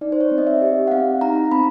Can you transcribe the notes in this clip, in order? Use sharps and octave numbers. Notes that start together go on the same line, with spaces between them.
D#4 D5
C5
C#5
C4 D5
D#5
E5
G4
F#5
C4 F5
D#4 A#5
C4 B5